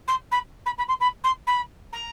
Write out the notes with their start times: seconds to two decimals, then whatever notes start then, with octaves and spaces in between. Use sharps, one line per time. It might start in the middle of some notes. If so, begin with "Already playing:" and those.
0.08 C6
0.31 B5
0.66 B5
0.78 B5
0.88 C6
1.00 B5
1.24 C6
1.47 B5
1.93 A#5